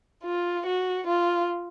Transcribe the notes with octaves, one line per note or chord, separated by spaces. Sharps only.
F4
F#4
F4